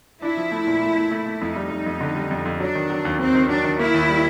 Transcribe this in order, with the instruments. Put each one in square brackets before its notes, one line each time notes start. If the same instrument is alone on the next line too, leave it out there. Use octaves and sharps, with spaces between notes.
[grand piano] D4 [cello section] E4
[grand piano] F3
A3
A#2
A3
A3
A3
A3
[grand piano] F2 [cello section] D#4
[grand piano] G3
G3
F2
D3
G3
F2
F2
[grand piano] F#3 [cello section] D4
[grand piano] D#3
F#3
D#2
[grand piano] D#2 [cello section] C4
[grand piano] D#3
[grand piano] F#3 [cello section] D4
[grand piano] D#3
[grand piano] A#3 [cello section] E4
[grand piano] D#2
G3